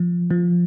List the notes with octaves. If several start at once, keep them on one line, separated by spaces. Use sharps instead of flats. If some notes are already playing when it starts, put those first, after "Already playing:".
Already playing: F3
F3